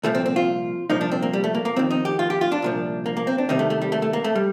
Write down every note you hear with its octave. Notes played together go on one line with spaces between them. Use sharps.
C2 A#2 F3 A3
C4
C4
F4
C2 A#2 F3 D#4
D4
C4
A#3
G3
A3
A#3
A#3
F2 D#3 C4
D#4
G4
F4
G4
F4
D4
C2 A#2 F3
A#3
A#3
C4
D4
C2 C3 D#3 D#4
A3
A3
G3
A3
A3
A#3
A3
G3